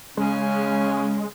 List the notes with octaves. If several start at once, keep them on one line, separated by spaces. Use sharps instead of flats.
C#3 G#3 C#4